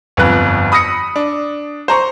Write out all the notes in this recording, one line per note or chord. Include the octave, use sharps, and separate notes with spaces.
G1 F2 B4 F#6
B5 D#6 E6 A#6 C#7
D4
C5 A#5 C#6